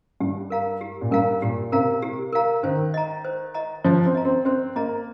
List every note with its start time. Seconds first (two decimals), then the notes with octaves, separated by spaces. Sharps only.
0.20 G2 G4
0.50 A#4 F5 A#5
0.81 G4
1.01 A#2
1.11 G2 A#4 F5 A#5
1.42 A#2 G4
1.72 C3 A#4 F5 A#5
2.02 G4
2.33 A#4 F5 A#5
2.63 D#3 C5
2.94 D#5 A#5
3.25 C5
3.54 D#5 A#5
3.84 F3 C5
4.06 C4
4.15 D#5 A#5
4.25 C4
4.45 C4 C5
4.76 A#3 D#5 A#5